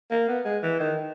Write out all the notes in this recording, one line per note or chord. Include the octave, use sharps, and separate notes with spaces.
A#3
B3
G#3
E3
D#3